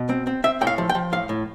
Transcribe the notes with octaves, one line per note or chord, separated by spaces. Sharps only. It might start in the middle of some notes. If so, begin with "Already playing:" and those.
Already playing: B2
C4
C4
C4 E5
A2 G5
F5
F3
G5
F3
A2 F5
A2